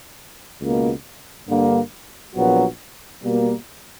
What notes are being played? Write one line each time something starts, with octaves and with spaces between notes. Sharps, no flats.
C#2 B2 A#3
G2 D3 A#3
A#1 A#2 F#3 B3 F#4
B2 G3 A#3